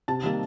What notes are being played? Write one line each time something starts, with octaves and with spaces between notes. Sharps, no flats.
C3 A5
D#3 G3 A#3